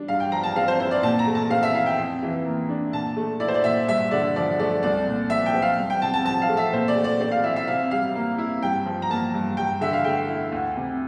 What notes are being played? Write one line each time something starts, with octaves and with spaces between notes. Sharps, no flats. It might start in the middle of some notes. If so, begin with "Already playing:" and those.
Already playing: G3 D4
G2 F5
G5
F3 A#5
A5
C4 F5
C5
E4 C5
D5
A#2 A5
A#5
A3
A5
C4 F5
E5
E4 F5
G5
F2
E3
A#3
D4
A#2 A5
A3
E4 D5
C5
D5
A#2 E5
G2 E5
D3 D5
F3 D5
A3 D5
C2 D5
A#2
F3 E5
G5
C4
F5
C2
G5
C3 A5
A5
F3 A5
F5
A3
E5
A#2 C5
D5
A3
D5
C4 D5
F5
E4 E5
E5
C3 F5
G3 F5
A#3
E4
G2 G5
F3
A#5
A#3 A5
G2
G2 G5
D3 E5
F5
A3 G5
E4
D2
C3